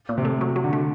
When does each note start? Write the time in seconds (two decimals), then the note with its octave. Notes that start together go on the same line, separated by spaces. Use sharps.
0.09 A#2
0.18 C3
0.25 A3
0.41 F#3
0.56 F#3
0.64 D3
0.73 A3